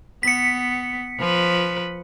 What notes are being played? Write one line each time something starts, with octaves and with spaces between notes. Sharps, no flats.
B3 B6 C#7
F3 B4